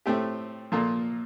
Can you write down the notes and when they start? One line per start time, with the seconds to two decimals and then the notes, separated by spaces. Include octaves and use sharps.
0.06 A2 A3 C4 G4
0.72 A#2 F3 A#3 F4 A4